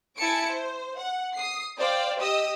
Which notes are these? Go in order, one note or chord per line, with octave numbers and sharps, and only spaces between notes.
E4 G#5 A5 C#7 D7
C5
F#5
D#6 C7
C5 D5 F5 G5
G4 D#5 D#6 E6